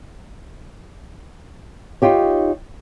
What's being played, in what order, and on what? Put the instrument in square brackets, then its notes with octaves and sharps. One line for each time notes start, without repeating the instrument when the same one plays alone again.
[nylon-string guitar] D#4 F4 G4 C#5